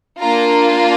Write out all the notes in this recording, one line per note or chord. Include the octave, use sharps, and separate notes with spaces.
A#3 D4 F4 A#5